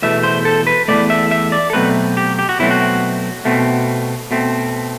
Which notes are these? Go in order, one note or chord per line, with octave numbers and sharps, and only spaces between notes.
E2 B2 A3 E5
C5
A4
B4
E2 B2 A3 D5
E5
E5
D5
A4
B2 F#3 A3 C4 B4
G4
G4
F#4
B2 F#3 A3 C4 E4
F#4
B2 A3 C4
B2 A3 C4